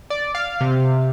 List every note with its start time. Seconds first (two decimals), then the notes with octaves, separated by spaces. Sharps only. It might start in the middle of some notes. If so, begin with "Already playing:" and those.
0.10 D5
0.35 F5
0.61 C3